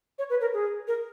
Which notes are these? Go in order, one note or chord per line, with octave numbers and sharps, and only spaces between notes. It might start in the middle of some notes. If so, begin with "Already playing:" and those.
C#5
B4
A#4
G#4
A#4